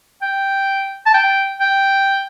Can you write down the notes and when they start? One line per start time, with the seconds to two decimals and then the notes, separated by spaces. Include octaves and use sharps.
0.22 G5
1.06 A5
1.14 G5
1.60 G5